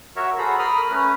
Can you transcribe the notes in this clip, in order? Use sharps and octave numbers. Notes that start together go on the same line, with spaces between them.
F#4 A#4 C#5 E5
F#4 G#4 A4 C5 A#5 B5
A#4 B5 D#6 F6
A3 C#4 B4